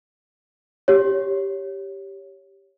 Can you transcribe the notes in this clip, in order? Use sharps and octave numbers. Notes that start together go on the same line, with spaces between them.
G4 C#5